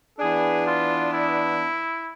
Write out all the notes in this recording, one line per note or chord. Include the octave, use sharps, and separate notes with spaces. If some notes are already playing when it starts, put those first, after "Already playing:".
E3 B3 D4 G#4
F4
E4